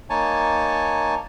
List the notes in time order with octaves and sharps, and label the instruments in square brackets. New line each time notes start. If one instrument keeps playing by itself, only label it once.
[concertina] A#3 D#4 C#5 G#5 A5